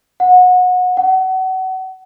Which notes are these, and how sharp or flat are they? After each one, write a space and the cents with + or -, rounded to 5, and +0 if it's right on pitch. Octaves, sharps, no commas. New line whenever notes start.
F#5 -25
F#5 +30